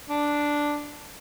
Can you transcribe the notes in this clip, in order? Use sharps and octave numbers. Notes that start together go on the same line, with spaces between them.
D4